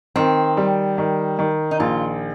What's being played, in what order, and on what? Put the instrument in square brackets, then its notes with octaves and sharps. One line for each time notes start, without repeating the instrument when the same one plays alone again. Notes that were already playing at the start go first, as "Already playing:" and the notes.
[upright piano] D#3 [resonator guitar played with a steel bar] C4
[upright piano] G3
D#3
D#3
[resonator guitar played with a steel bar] D#4
[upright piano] A#1 [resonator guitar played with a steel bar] F4